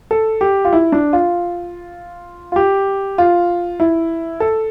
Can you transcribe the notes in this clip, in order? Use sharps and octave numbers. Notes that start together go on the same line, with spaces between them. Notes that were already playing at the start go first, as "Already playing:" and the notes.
A4
G4
F4
E4
D4
F4
F4
G4
F4
E4
A4